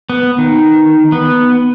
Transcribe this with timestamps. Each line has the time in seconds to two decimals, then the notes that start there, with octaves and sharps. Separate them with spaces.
0.10 B3
0.38 D#3
1.12 B3